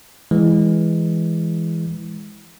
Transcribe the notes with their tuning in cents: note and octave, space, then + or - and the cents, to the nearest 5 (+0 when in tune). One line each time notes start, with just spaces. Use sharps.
E3 +0 G#3 -5